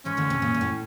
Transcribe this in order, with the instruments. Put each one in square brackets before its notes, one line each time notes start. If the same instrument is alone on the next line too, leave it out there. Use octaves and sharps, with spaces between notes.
[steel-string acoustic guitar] G#2 G#3 [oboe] C#4
[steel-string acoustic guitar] D2 D3
C3
A#2
A#2
A2